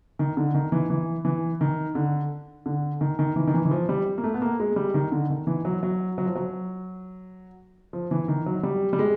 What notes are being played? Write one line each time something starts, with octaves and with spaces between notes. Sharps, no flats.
D#3
D3
D#3
E3
E3
E3
D#3
D3
D3
D#3
D#3
E3
D#3
E3
E3
F3
G3
A#3
A3
B3
A#3
G#3
G3
D#3
D3
D#3
E3
F#3
F#3
F#3
F3
F#3
F3
E3
D#3
F#3
G3
G3
G#3